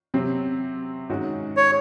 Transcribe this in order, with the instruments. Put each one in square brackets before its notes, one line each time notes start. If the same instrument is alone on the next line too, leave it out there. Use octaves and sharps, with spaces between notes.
[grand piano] C3 F#3 C4
G#2 D#3 G#3 C#4 F#4
[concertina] C#5